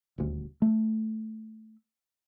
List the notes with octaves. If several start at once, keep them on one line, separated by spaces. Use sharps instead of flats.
D#1 D2
A3